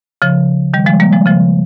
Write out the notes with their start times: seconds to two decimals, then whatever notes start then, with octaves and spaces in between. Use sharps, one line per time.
0.22 C#3 F3
0.74 D#3 G3
0.86 F3 G#3
1.00 G3 A#3
1.13 F3 G#3
1.26 C#3 F3